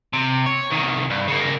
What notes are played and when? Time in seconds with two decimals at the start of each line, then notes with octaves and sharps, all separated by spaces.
0.13 C3
0.46 C#5
0.71 C2 D#3
1.10 G2
1.28 C#3 A#3